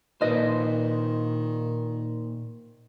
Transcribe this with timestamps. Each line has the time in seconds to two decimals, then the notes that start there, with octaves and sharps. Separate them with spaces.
0.21 A#2 D#3 B4 C5 D#5